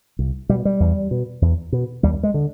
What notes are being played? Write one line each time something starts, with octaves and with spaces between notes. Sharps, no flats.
C2
B2 G3
G3
E2
B2
E2
B2
D#2 G3
G#3
D3